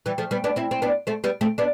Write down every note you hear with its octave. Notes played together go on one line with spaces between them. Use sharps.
E3 G3
F3 A3
G3 B3
B3 D4
C4 E4
C4
B3 D4
A3 C4
G3 B3
A3 C4
B3 D4